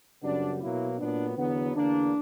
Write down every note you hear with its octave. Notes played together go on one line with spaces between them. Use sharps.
F#2 C#3 G3 B3 D4
B2 F#3 A#3 E4
A#2 F#3 B3 D4
E2 D3 F#3 B3
E2 D3 A#3 D4